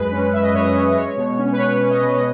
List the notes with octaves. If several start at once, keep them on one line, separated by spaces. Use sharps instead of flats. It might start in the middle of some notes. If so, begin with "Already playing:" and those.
Already playing: F#2 G#3 B4
C#4
F#2 E5
D#5
F#2 C#5
D#5
C#4
G#3 C#5
B2
C#4
B4
B2 C#5
C#4
D#5
B2
D#5